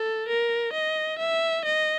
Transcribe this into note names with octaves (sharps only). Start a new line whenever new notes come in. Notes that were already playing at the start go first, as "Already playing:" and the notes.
Already playing: A4
A#4
D#5
E5
D#5